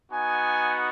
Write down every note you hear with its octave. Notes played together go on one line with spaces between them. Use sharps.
B3 D#4 F#4 G#5